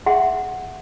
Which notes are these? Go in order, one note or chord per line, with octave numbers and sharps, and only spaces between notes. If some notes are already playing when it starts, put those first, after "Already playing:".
G#4 E5 F#5 C6